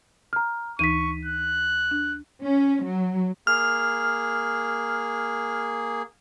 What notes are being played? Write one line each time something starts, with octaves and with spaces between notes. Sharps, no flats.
A#5 F6
D2 E3 D#4 C#6 B6 D#7
F#6
D4
C#4
F#3
A#3 G#4 F6